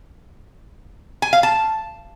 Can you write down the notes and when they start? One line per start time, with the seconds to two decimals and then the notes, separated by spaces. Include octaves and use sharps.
1.22 G#5
1.33 F5
1.43 A5